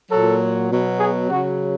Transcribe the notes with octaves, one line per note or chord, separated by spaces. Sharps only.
A#2 F#3 A4
B2 F#3
G#4
C#3 F#3 F#4